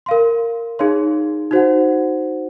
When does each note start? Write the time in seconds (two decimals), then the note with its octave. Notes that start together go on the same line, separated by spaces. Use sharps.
0.06 A#4 F5 C6
0.79 D#4 G#4 C#5 F5 C6
1.51 D#4 F#4 C5 F#5